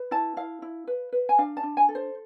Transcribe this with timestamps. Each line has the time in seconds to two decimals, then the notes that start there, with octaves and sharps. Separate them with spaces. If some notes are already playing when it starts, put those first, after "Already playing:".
Already playing: B4
0.11 E4 A5
0.37 E4 F5
0.62 E4
0.87 B4
1.12 B4
1.29 G#5
1.38 D4 F5
1.57 A5
1.63 D4
1.77 G#5
1.89 A4
1.95 C5